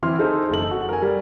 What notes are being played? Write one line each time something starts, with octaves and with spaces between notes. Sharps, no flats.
E3 C4 E4 C6 F6
D#4 G#4 A4 C5
F#1 A4 F#7
F#4
A#4 G#5
G3